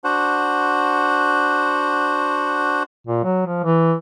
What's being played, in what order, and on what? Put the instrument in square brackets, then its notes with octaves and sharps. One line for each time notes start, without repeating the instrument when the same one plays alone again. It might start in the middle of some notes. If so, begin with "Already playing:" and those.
[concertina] D4 F#4 C5 F#5
[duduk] A#2
F#3
F3
E3